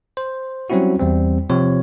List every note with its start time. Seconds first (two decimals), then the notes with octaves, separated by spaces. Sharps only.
0.17 C5
0.70 F#3 G3 C4 C#4 E4 F#4
1.00 E2 G3 C4
1.50 C3 F3 C4 C#5